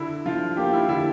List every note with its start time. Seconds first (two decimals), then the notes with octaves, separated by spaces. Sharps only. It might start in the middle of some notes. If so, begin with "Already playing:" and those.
Already playing: D3 E4
0.26 F3 F4
0.57 A#3 G4
0.73 E4
0.88 D3 E4